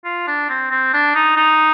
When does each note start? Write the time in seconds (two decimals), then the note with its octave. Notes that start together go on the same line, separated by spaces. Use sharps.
0.05 F4
0.28 D4
0.49 C4
0.71 C4
0.94 D4
1.15 D#4
1.37 D#4